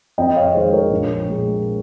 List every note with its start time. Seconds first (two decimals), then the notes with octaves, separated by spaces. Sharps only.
0.18 F2 D#5 G5
0.36 C#5 F5
0.54 D#3 G#3 C5 D#5
0.73 A#4 C#5
0.91 A#1
1.28 A#2 G#3